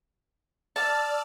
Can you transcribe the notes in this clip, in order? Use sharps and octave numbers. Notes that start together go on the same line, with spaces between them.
D5 A5 E6 F6